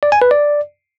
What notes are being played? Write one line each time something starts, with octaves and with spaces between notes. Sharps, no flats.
D5
G#5
B4
D5